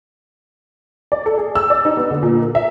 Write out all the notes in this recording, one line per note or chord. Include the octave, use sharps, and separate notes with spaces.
D5
A4
G#4
E6
D5
D#4
B3
D3
A#2
A#4
E5